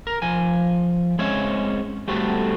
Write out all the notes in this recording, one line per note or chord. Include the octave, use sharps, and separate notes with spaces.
A#4
F3 G#5
G#3 C4 C#4 C#5 E5
G3 A3 B3 C4 F#4 A4